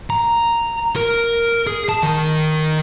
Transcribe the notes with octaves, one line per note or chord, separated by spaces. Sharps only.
A#5
A#4
G#4
A5
D#3